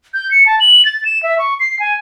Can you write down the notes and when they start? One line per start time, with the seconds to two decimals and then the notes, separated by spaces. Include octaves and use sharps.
0.14 G6
0.31 C#7
0.46 A5
0.60 F#7
0.85 A6
1.05 E7
1.23 E5
1.39 C#6
1.60 C7
1.79 G#5